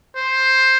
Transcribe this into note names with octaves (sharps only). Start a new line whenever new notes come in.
C5